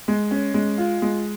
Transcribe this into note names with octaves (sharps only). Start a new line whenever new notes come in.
G#3
C#4
G#3
F4
G#3